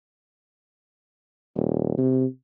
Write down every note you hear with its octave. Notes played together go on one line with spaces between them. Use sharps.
D#1
C3